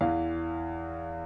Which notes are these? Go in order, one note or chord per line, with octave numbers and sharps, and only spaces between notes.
E2 E3 F5